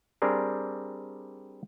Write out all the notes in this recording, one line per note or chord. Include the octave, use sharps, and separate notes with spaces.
G3 C4 D4 G#4 A#4